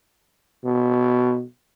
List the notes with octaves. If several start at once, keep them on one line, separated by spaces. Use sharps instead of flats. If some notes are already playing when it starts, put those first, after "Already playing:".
B2